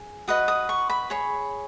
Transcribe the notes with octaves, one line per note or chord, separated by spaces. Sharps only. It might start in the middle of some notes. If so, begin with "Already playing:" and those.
Already playing: G#4
F#4 B4 D#5 D#6
D#6
C#6
B5
G#4 C#5